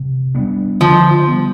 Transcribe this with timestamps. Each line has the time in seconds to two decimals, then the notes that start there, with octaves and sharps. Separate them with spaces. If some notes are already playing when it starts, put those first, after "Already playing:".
Already playing: C3
0.35 G3 B3 D4
0.81 D3 F3
1.27 G3 B3